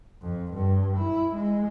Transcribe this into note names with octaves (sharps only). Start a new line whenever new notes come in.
F2
G2
E4
G#3